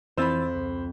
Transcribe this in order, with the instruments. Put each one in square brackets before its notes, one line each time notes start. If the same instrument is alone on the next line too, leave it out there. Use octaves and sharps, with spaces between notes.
[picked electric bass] F2 C4 [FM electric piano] E3 E6 A6 [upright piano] C5 B5
[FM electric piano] C#2